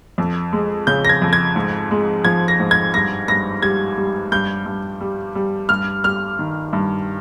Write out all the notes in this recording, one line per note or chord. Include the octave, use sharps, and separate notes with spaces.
F2
G#3
C#3 G6
A#6
G#6
F2
G#6
G#2
G#3
F3 G#6
A#6
G#2
G#6
G2 A#6
G2 A#6
G3 G#6
G3
G2 G6
G2
G3
G3
G2 F6
G3 F6
D#3
G2